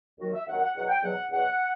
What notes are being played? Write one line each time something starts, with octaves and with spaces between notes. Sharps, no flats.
D#2 D#3 F#3 F#4
E5
D#2 D#3 F#3 F#5
F#5
E2 B2 F#3 F#5
G5
E2 B2 F#3 F#5
E2 B2 F#3 F#5